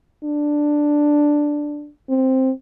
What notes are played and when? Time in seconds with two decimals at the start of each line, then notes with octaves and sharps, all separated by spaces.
0.23 D4
2.09 C4